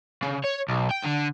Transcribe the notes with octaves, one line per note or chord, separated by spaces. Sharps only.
C#3
C#5
B1
G5
D3